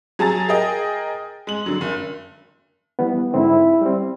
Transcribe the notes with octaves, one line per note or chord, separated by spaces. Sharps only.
F#3 G#4 A5 A#5 A6
G#4 A#4 D#5 G5
G#3 F#7
D3 F#3
F#1
E3 G3 B3
G#2 D3 C4 E4
G3 C4